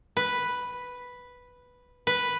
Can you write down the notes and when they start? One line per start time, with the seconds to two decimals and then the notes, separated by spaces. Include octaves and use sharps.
0.17 B4
2.07 B4